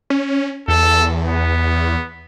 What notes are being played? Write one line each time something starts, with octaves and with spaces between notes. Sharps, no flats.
C#4
E2 A4
B3